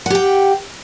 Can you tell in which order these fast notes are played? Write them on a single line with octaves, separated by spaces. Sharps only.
F#5 G4 G5